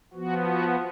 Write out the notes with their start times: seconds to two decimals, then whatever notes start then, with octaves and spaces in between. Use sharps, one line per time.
0.14 F3 B3 F#4
0.44 F#4